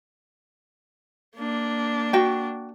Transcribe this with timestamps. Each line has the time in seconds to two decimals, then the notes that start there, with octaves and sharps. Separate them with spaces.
1.37 A#3 D4
2.13 F#4 G5